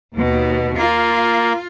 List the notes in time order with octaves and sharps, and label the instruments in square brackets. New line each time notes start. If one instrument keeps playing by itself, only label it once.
[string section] D#2 B2
[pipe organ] A#3 [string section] F4